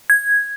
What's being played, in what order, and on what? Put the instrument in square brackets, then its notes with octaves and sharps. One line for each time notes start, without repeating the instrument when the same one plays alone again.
[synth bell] G#6